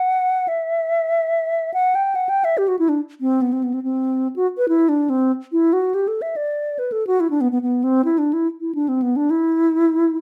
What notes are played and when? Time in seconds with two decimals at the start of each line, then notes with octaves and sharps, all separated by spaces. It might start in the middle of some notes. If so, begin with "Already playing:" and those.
Already playing: F#5
0.48 E5
1.74 F#5
1.95 G5
2.15 F#5
2.29 G5
2.44 E5
2.58 G4
2.68 F#4
2.79 E4
2.89 D4
3.21 C4
3.42 B3
3.53 C4
3.64 B3
3.74 C4
3.84 C4
4.36 F#4
4.58 B4
4.69 E4
4.89 D4
5.10 C4
5.52 E4
5.73 F#4
5.94 G4
6.08 A4
6.22 E5
6.36 D5
6.79 B4
6.92 A4
7.07 F#4
7.20 E4
7.30 D4
7.41 B3
7.52 B3
7.62 B3
7.84 C4
8.05 E4
8.18 D4
8.33 E4
8.60 E4
8.75 D4
8.88 C4
9.02 B3
9.16 D4
9.30 E4